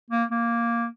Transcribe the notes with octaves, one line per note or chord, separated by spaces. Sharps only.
A#3
A#3